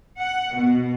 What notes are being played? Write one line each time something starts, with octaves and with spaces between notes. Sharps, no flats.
F#5
B2